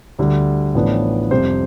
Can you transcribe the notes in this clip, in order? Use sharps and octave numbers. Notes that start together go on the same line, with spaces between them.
D2 D3 G3
A1 A2 F3 B3 D4
F1 F2 C3 G3 C5